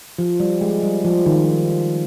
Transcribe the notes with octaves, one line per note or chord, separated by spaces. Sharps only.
F3
G3
G#3
G3
F3
D#3